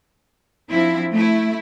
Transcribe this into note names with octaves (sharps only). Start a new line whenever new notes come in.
F3 C4 D4 E4
A3 E4